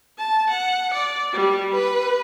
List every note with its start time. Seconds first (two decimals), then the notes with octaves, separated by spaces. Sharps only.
0.19 A5
0.50 F#5
0.94 D5
1.33 G3
1.74 B4